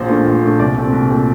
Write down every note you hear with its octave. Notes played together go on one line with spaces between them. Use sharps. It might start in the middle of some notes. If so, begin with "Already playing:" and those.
Already playing: A#1 C5
A#2 A3 D4
A#1
A#2 A3 D4
C2 D5
A#2 A3 C4
C2
A#2 A3 C4